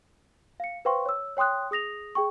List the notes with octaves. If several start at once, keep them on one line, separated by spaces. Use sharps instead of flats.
F5 C#7
B4 C5 F5 G5 C6 C#6
C#5 E6
C#5 G5 C6 D#6 F#6
G#4 D#6 A#6 F7
G#4 G5 C#6